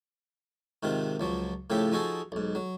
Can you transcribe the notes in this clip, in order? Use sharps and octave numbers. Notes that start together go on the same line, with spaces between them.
G#2 C3 D#3 F4
C#2 F3 F#3
A2 C#3 F3 G4 A4
F3 D#4 F#4 G#4 A4
B1 G#2
F#3